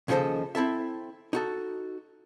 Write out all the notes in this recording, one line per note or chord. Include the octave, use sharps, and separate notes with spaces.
D#2 C#3 F3 A4 C5 D#5
C4 E4 A4 E5
D#4 F#4 A4